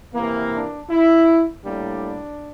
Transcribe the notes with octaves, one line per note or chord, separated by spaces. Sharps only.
C3 E3 A#3
D4
E4
A2 G3 A#3 D4